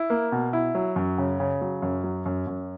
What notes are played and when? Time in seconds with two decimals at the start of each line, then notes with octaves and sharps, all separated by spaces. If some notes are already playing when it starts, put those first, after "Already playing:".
Already playing: E4
0.10 A#3
0.32 B2
0.53 E4
0.75 F#3
0.96 F#2
1.18 C#3
1.40 C#3
1.61 F#3
1.82 F#2
2.04 F#3
2.26 F#2
2.47 F#2